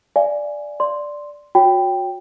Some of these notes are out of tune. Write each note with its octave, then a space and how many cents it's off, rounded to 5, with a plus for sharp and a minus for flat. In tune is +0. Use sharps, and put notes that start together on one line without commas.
D5 +0 F5 -45 G#5 +0
D5 +0 C6 +0
F#4 -30 C#5 +0 G5 +0